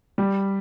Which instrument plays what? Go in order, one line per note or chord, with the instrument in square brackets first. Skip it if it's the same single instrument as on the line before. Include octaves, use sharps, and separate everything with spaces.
[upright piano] G3